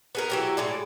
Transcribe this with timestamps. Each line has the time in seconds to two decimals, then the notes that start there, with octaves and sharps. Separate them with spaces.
0.15 B3 G#4 A#4
0.30 E3 F#3 G4
0.57 A2 G#3 D5